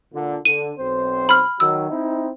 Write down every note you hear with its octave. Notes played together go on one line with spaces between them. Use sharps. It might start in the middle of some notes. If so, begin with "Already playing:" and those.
A#2 D3
D3 D#7
B1 C4 C5
B5 F6
D#3 F#3 E6
C4 D#4 E4